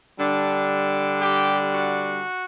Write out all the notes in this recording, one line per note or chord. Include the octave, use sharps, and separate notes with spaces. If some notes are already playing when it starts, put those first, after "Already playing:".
D3 G3 D4
G4
F#4